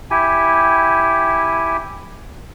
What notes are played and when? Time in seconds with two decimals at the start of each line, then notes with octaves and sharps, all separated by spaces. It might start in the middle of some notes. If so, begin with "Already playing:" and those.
0.11 E4 G4 G#5